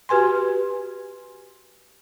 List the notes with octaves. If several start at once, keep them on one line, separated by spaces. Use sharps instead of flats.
F#4 G4 B4 G#5 C6